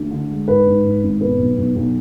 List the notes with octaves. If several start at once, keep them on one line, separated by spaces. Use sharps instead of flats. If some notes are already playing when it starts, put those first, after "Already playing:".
Already playing: D2
D3
G#3
G#2 B4
G#2
G#2
G#1
B2 B4
B1
B1
B1